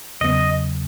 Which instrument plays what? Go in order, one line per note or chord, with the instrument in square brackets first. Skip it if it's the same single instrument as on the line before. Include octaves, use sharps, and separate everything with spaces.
[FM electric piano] E2 C#3 F#3 B3 [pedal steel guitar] D#5